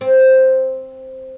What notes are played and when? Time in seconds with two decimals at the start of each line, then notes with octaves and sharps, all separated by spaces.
0.01 C4